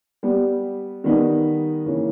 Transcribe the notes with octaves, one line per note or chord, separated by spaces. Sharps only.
G3 B3 G4
D#3 G3 B3 D#4
C#3 E3 A#3 C#4